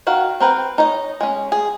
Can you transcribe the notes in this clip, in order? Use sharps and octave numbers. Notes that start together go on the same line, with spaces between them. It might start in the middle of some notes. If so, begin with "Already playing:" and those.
D#3 F#4 F5
C4 A#4 B4 G5
D#4 C#5 D#5
G#3 C#4
G#4